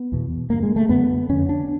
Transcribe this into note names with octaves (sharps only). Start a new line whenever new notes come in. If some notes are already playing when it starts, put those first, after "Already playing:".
Already playing: B3
E2 B2
G2 D3 A#3
G#3
A3
F#2 D3 B3
F2 D3 C#4
D4